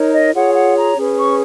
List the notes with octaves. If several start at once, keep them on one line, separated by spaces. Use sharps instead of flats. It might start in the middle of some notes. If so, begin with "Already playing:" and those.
Already playing: D#4 A#4 C#5
D#5
F4 G#4 C#5 F#5
F#5
A#5
C#4 G#4 B4
C#6